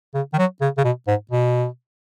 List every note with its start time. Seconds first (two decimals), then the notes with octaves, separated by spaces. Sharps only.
0.14 C#3
0.33 D#3
0.38 F#3
0.61 C#3
0.78 C#3
0.84 B2
1.07 G#2
1.31 B2